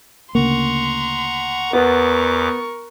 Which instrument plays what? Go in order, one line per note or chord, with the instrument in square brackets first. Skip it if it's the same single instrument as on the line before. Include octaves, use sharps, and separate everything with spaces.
[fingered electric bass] D2 C#3 A#3 [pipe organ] F#5 A#5 C#6 [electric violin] C6
[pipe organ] E2 D6 [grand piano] B3 [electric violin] A#4 C#6